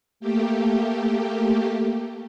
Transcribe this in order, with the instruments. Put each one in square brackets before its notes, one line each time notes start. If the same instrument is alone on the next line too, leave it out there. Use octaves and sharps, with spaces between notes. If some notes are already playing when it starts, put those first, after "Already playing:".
[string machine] A3 A#3 G4